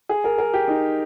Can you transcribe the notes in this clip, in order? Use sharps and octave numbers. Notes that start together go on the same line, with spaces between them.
G#4
A#4
A#4
G4
D#4